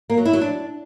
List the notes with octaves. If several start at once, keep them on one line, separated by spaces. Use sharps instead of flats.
A#3
F#3
E4
F#3
D4